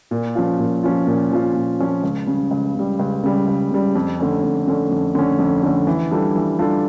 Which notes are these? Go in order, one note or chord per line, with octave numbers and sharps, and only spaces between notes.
A#2
F3 C#4 F4
A#2
F3 C#4 F4
A#2
F3 C#4 F4
A#2
F3 C#4 F4
C#2
C#3 G3
C#2
C#3 G3
C#2
C#3 G3
C#2
C#3 G3
F2
D3 A3 C#4
F2
D3 A3 C#4
F2
D3 A3 C#4
F2
D3 A3 C#4
E3
G3 D4 F4 A4
E3
G3 D4 F4 A4